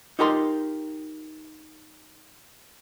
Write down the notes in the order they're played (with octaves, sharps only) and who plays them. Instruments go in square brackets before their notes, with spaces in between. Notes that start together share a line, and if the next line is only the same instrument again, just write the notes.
[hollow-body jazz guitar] D#4 F4 G4 A#4 A#5 C6